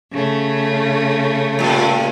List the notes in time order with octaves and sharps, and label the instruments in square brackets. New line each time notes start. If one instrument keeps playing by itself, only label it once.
[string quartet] C#3 A3
[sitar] G2 A#2